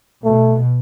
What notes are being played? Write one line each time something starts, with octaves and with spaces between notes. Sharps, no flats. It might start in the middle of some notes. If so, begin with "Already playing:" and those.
B2 A3